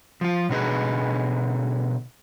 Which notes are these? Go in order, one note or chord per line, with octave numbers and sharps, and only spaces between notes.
F3 F4
B2 D3 D#4 G#4 B4